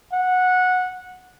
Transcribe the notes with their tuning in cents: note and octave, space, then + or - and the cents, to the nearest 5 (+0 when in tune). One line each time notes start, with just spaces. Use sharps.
F#5 -15